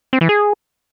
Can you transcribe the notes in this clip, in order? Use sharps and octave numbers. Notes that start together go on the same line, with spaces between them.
C4
E3
G#4